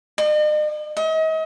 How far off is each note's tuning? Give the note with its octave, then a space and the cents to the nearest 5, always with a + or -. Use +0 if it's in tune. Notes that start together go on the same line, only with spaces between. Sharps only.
D#5 -45
D#5 +40